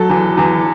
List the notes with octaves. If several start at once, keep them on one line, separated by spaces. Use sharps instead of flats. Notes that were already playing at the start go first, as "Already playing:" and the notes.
Already playing: F#3 A4
E2
E2